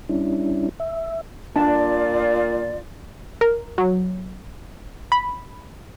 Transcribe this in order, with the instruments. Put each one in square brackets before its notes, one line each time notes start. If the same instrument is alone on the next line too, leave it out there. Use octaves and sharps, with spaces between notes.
[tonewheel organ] G3 C#4 D4 E4
E5
[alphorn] A#2 [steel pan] D4 A5 [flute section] F4 D5
[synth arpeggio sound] A#4
F#3
B5